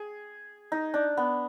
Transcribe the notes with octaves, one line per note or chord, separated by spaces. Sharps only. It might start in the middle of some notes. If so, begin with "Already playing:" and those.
Already playing: G#4
D#4
D4
B3